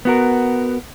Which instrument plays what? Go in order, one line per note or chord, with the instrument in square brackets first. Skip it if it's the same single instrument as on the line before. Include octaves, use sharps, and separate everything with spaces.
[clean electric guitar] B3 F#4 A#4